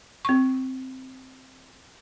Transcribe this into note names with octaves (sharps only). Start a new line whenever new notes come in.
C4 C#6